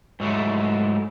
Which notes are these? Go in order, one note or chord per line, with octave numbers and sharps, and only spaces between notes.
G#2 F#3 A3 E4